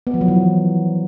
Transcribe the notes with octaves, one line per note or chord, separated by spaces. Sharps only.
B3
F3
F#3
E3